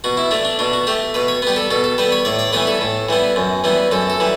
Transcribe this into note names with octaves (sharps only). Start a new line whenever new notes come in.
B2 F#4
E4
A3 D4
D4
B2 D4
F#4
A3 G4
B2 B4
C#5
G3 B3 G4
A4
B2 A4
A4
G3 B3 B4
C#5
A2 D5
D5
E3 G3 B3 C#5
A4
A2
E3 G3 B3
F#2
E3 G3 B3
F#2 A4
A4
E3 G3